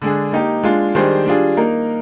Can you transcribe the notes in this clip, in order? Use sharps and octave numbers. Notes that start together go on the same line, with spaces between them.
D3 G#3 D4 G#4
A#3 D#4 G4
G#3 D4 F4
D#3 G3 D4 G#4 C5
G3 D4 F4 G#4
A#3 D#4 A#4